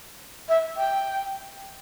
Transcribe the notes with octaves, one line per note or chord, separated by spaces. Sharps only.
E5
G5